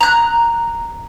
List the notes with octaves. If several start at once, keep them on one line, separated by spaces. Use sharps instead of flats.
A#5 F#6